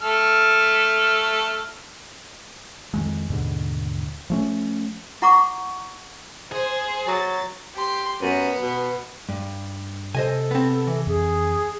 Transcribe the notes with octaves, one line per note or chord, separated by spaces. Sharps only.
A3 A4 F6
F2 D#3 G#3
D#2 G#2 B2 D3
F3 A3 C#4
E4 F#5 A#5 C#6 D6
G#4 C5
F#3 A6
G4 C6
F#2 B3 B4
B2
G2
C3 A4 C5 D#5 G#5
B3 C4
E3
F2 G#4